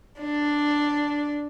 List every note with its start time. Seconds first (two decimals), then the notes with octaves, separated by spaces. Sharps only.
0.21 D4